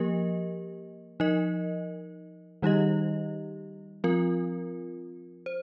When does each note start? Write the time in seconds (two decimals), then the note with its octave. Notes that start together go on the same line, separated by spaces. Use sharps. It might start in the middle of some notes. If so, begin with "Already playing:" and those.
Already playing: F3 A#3 G4 A#4 D#5
1.20 F3 D#4 A#4 D#5
2.62 D#3 G3 D#4 G4 D#5
4.04 F3 C4 F4 A#4
5.46 C5